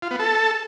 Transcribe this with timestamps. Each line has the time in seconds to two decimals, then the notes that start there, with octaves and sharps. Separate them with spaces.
0.02 F4
0.11 B3
0.19 A4